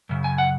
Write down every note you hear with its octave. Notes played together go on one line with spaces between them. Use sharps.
F#2 C#3
G#5
F#5